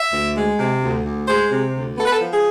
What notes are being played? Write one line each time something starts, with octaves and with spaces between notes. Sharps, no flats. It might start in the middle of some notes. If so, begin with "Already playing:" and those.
Already playing: E5
D2
G#3
C3
D2
D2
G#3 C5
C3
D2
B3 A4
B4
A4
F3
G#4